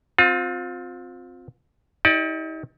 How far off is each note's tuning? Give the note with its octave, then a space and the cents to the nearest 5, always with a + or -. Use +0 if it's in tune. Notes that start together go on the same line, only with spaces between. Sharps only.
C4 +0 F4 +30
D#4 +45 G4 +0 D5 +15